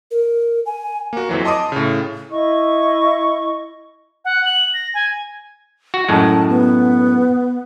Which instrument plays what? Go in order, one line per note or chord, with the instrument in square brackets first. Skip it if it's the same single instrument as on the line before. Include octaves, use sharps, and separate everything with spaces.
[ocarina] A#4
G#5
[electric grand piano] A#3 F#4
F2 E3 F#3
D#5 A5 C6 D6 D#6
A2 C#3
[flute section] E4 D#5 C#6
[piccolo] F#5
F#7
A#6
G#5
[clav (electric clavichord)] F#4
[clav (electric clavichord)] F#2 A2 G#3 [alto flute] A5
[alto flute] B3